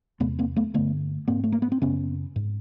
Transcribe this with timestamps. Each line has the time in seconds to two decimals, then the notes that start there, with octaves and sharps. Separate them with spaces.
0.20 E2 C3 A3 B3
0.39 A#3 C4
0.56 A3 B3
0.74 G2 D3 A3 B3
1.28 G#2 A#3 C4
1.44 A3
1.52 A#3
1.62 B3
1.72 C4
1.82 F#2 C#3 B3 C#4
2.36 G#2